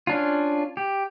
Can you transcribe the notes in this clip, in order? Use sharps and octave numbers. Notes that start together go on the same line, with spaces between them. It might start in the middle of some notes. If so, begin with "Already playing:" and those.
C#4 D4 F4
G4